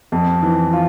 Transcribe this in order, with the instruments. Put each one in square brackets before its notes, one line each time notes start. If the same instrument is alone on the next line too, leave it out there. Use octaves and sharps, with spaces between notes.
[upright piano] F2
E3
F4